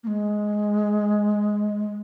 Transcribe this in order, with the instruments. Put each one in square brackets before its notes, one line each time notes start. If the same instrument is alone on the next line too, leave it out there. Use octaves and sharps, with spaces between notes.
[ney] A#3
G#3